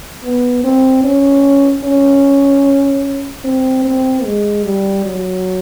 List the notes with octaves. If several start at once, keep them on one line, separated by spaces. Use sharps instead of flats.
B3
C4
C#4
C#4
C4
C4
G#3
G3
F#3